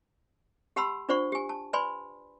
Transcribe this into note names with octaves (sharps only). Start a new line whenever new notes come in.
G4 F#5 A5 B5 C6 E6
D4 F4 C5 D5 F#5 C#6
G4 G#5
A5
B4 D5 G#5 B5 C6